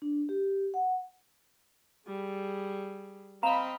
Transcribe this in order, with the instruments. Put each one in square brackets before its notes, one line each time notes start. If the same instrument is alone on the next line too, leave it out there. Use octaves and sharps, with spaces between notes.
[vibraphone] D4
G4
F#5
[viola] G3 G#4
[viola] C4 D#5 [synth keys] F5 B5 [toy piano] A#5